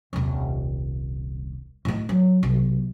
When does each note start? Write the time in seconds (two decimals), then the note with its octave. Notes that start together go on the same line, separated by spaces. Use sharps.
0.13 D#1 C2
1.85 A2 D#4
2.09 F#3
2.43 B1 C3